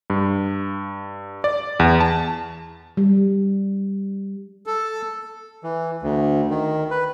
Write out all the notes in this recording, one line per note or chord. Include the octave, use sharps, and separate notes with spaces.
G2
D5
E2
A5
G3
A4
E3
D2
D#3
B4